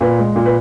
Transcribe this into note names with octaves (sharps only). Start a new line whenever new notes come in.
A#2 B4
G#3
A#2
B4